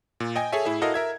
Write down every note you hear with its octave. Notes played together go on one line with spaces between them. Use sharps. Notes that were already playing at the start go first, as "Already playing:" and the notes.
A#2
D#5 G5 G#5
G#4 A4 C#5 E5 G#5
A2 E4 G#4 E5
E4 F#4 A4 A#4 D#5 F5
A#4 E5 G#6